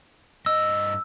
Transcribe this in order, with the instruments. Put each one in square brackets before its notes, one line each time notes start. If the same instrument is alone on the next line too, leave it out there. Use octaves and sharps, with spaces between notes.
[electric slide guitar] G2 D#5 [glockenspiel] E6